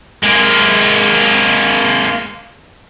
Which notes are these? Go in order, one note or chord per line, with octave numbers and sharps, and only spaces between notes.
G#3 A#3